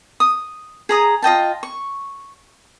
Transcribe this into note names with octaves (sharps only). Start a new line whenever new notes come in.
D#6
G#4 A#5 D#6
F4 D#5 G5 A5
C#6